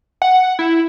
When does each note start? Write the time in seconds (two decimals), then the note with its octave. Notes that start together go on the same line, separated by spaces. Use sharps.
0.22 F#5
0.59 E4